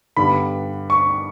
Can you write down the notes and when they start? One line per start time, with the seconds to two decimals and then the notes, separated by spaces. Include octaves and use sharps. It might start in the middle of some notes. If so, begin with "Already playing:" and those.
0.17 G2 D3 G3 B3 B5
0.90 C#6